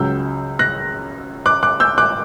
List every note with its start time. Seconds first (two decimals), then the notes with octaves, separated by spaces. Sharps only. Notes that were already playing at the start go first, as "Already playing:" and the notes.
Already playing: C#2 C#3 F#3 E6 G6
0.59 F#6 A#6
1.46 D6 F#6
1.63 D6 F#6
1.80 E6 G6
1.98 D6 F#6